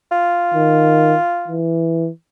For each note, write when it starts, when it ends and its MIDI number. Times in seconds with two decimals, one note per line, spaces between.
0.12 1.58 65
0.54 1.15 51
1.48 2.09 52